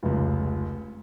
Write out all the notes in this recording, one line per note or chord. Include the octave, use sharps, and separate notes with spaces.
F1 C#2